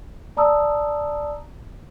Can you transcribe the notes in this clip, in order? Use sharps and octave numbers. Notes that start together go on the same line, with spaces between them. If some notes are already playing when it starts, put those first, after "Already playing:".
D5 A5 A#5 D#6 E6